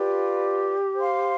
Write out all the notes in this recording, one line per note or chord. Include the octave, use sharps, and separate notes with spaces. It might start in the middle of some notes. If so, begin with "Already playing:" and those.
Already playing: F4 G4 B4 D5
C5 F5 C6